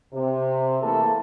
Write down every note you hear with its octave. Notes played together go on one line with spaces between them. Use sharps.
C3
E3 A3 A#3 G#4 A4